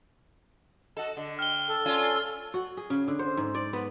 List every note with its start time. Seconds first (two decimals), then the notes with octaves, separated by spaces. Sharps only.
0.97 F#4 A4 D#5
1.17 D3 D#5
1.39 G5 F6 G7
1.67 A4
1.86 C#4 F4 D5
2.54 F#4
2.77 G#4
2.90 C#3
3.08 D3
3.19 C5
3.37 G#2
3.54 D5
3.73 B3